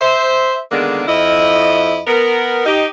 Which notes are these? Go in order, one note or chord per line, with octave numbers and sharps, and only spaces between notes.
C5 E5
D3 D#3 G#3 A#3 B3 D4
F2 E4 D#5
B3 A#4
D#4 G4